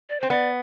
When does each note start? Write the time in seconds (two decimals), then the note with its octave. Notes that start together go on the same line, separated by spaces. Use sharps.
0.09 D5
0.20 C4 C5
0.30 B3 D5